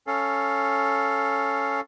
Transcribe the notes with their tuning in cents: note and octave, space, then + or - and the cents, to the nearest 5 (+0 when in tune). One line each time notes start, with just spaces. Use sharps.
C#4 +0 A4 +0 F5 +0